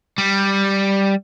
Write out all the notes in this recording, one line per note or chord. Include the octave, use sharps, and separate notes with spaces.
G3